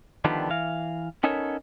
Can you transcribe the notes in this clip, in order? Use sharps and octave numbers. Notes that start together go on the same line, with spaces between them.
D3 D#3 F3 G3 B3 D4
E3 F5
B3 C#4 D#4 A4 A#4 C#5